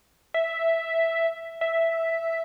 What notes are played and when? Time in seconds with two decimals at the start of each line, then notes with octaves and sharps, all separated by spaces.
0.34 E5
1.61 E5